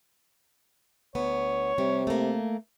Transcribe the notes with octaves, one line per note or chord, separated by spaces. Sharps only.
D2 B3 C#5
C3 G3
A3 A#3